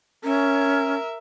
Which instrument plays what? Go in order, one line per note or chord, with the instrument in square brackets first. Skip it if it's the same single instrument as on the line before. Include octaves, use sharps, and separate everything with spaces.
[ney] C#4 [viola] A#4 E5